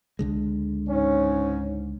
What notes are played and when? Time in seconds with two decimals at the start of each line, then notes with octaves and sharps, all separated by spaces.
0.19 C#2 D3 G#3
0.88 G#2 C#4